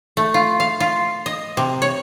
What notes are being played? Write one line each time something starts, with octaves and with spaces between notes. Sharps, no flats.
A3
F4
F5
F4
D#5
C3
C#5